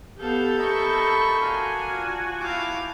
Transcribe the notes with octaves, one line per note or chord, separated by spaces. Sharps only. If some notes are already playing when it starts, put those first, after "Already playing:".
B3 G4 A4 F5 G6
E4 A#4 D#5 B5 C#6
D4 F#4 A#4 F5 G#5
F4
E4 F5 G5 A5 D6